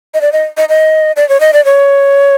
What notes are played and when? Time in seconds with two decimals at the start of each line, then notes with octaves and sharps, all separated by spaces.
0.14 D#5
0.21 D5
0.32 D#5
0.57 D#5
0.69 D#5
1.16 D5
1.29 C#5
1.40 D#5
1.53 D5
1.65 C#5